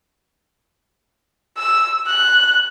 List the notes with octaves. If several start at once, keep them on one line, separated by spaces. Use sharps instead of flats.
E6
F#6